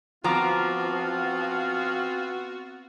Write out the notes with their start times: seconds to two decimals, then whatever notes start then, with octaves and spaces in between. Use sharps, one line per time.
0.24 F3 B3 C4 F4 F#4 A#5 D6